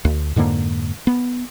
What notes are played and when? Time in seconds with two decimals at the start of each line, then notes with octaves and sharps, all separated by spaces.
0.05 D2
0.36 F2 G#2 D3 A#3
1.07 B3